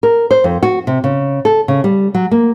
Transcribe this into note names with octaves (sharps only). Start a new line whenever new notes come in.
A#4
C5
F2
F#4
C3
C#3
A4
C#3
G3
F#3
A#3